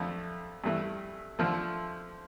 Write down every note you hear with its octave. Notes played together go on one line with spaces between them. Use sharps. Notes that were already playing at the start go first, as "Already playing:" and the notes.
Already playing: F2 D3 A3
G2 E3 A3 E4
D3 F3 A3